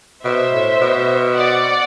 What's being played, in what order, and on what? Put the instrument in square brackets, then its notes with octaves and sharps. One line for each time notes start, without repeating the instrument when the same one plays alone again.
[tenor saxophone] B2 [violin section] C5 E5
[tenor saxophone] A2
B2
[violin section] D5 F#5